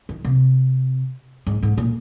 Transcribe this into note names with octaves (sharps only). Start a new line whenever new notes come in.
D#3
C3
G#2
G#2
A#2